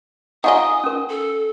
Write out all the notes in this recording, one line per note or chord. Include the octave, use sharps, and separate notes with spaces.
D#4 F4 D#5 F#5 G#5 D#6
C#4 A#4
A4